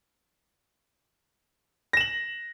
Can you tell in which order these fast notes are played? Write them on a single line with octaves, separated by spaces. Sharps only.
A#6 E7 F#7